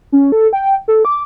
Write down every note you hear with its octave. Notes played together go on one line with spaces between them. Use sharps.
C#4
A4
G5
A4
D6